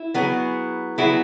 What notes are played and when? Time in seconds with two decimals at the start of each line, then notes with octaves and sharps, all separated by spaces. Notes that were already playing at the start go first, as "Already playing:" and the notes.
Already playing: E4
0.14 F#3 B3 G#4
0.98 F#3 B3 E4 G#4